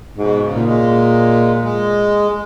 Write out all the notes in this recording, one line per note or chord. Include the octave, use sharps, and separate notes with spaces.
G#2 B2
C#3
A#2
G#3
G#3